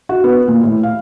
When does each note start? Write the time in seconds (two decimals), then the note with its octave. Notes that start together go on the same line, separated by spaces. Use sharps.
0.09 F#4
0.24 B3
0.48 A#2
0.64 A2
0.83 F5